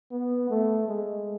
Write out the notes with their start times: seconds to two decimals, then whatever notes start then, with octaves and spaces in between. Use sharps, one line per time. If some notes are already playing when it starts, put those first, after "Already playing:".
0.12 B3
0.50 A3
0.88 G#3